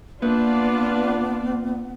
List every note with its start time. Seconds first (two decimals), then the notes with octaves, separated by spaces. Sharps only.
0.22 A#3 B3 D4 F4 B4 D5